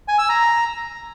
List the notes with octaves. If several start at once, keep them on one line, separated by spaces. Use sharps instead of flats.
G#5
E6
A#5